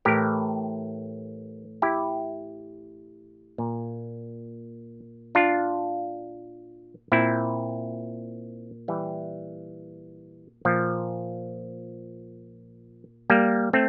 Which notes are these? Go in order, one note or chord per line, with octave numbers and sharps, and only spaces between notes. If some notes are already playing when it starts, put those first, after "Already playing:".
A2 E3 G4 A#4
E4 G4
A#2
D4 F4
A#2 C4 E4
E3 G3
A#2 F3
G3 A#3
A3 C4